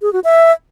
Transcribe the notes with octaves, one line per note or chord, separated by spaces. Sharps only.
G#4
F#4
E5